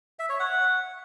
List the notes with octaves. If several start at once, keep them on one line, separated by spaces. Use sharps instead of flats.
E5
C#5
F#5